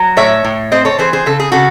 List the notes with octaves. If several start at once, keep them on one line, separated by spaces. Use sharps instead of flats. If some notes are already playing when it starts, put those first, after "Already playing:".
Already playing: F#3
A2 C#5 E5
A2
C4 C5 D#5
A4 C#5
E3 G#4 C5
G#4 C5
C#3 A4
G#4
C#3 F#4 A4